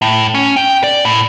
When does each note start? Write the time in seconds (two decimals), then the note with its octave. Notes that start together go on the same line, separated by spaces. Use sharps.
0.02 A2
0.35 C#4
0.57 G5
0.84 D5
1.05 A2